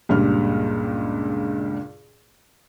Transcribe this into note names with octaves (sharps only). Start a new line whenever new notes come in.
C#2 G2 A#2 G3 F6